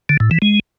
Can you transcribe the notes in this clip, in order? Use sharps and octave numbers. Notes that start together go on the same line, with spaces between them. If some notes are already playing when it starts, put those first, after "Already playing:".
D3
A2
E3
G#3